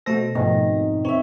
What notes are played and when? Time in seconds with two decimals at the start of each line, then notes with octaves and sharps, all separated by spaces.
0.06 B2 A3 A4 C5 A#6
0.35 F2 G#2 B2 D#3
1.05 C4 C#5 E5